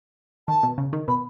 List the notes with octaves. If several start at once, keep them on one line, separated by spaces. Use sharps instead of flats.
D#3 A5
B2
C#3
D#3
B2 B5